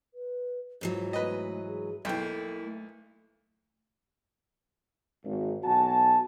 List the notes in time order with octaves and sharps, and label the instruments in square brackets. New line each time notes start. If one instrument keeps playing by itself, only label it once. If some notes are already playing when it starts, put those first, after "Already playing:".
[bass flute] B4
[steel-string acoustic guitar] G#2 E3 F#3 [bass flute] F4
[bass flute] A3 [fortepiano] B4 D#5
[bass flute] G#4
[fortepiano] B1 G5 [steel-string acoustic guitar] A#3 E4 [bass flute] A4
[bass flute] A3
[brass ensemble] G#1
B1 F#4 G#5 A5